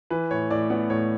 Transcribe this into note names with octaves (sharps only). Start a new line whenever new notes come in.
E3 B4
A2 C#5
A2 D5
B3 D5
A2 C#5